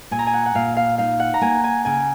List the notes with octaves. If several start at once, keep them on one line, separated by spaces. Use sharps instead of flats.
A#2 G#5
A#5
G#5
F#5
F#5
A#2 F5
F5
D#4 F5
F#5
A#5
A#3 G#5
G#5
C#3 G#5